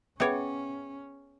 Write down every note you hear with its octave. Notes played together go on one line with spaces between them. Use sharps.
B3 C#4 G#4 C#5 E5 G5